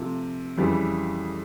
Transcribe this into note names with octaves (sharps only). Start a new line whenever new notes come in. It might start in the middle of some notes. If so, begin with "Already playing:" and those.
Already playing: C3 F3 A3
F2 C#3 E3 G3